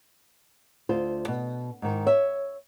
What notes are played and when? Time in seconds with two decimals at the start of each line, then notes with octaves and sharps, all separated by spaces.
0.89 D2 F4 C5
1.28 B2
1.82 G#2 D#3
2.06 C#5 E5